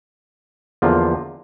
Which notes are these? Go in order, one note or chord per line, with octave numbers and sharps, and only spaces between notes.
E2 D3 F3 A#3 F4